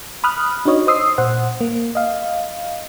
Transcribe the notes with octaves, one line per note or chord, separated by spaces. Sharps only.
B5 D#6 F6 F#6
D4 D#4 F#4 C#5 D#5
C5 D#5 D#6 E6 C7
A#2 C5 F#5
A#3
D#5 F5